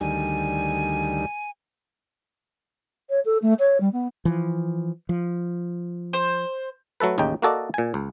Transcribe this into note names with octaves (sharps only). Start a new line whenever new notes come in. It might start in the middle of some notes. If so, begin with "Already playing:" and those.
D2 D#3 G3 G#5
C#5
A4
A3
C#5
G3
B3
E3 F3
F3
C5
F#3 A3 A4 B4
A1 D#2 C#3 D#4 G5
A#3 F#4 A4 D5 D#5
A#2 G#5
C#2